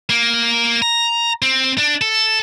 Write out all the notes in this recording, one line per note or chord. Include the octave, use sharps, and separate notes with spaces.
A#3
A#5
C4
D4
A4